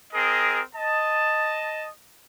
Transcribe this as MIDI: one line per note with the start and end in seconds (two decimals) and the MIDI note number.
0.14 0.61 60
0.14 0.61 68
0.14 0.61 70
0.14 0.61 75
0.75 1.86 75
0.75 1.86 81